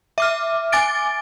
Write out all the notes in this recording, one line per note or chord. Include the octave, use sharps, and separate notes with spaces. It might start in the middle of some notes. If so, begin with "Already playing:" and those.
E5 D6 F6
G#5 D6 A6 D7